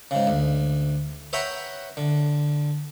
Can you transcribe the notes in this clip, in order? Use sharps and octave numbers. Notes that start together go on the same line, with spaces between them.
G#2 C#3
D2
B4 C#5 E5 F#5 G5 A#5
D3